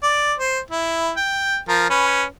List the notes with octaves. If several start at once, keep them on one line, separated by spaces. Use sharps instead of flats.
D5
C5
E4
G5
F3 A#4
C#4 B4